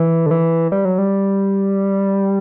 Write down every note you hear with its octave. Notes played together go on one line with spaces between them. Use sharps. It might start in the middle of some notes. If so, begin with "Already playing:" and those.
Already playing: E3
D3
E3
G3
F#3
G3